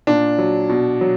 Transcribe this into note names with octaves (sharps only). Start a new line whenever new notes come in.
A#2 D4
F#3
B2
F#3